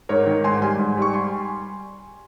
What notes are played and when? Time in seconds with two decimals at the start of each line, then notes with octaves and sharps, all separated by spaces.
0.09 G#2 A#4 C#5
0.26 D#3
0.44 G#2 G#5 C6
0.62 G3 G#5 C6
0.79 G#2
0.97 G3 C#6
1.14 G#5 C6